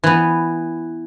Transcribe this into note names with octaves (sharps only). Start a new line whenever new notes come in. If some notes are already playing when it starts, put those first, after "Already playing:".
E3 B3